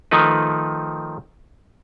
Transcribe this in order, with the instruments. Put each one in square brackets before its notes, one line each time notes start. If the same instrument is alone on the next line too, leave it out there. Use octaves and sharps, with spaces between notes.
[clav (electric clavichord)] D#3 F3 A3 D#4 B4